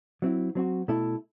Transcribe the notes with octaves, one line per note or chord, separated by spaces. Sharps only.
F#3 C4 E4
F#3 C4 F#4
B2 A3 E4 A4